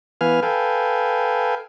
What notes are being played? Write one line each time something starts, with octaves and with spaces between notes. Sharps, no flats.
E3 B3 B4 F5 G#5 F6
A4 B4 F5 G5 G#5